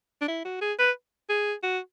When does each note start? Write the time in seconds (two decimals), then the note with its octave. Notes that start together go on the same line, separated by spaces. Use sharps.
0.21 D4
0.28 E4
0.45 F#4
0.61 G#4
0.79 B4
1.29 G#4
1.63 F#4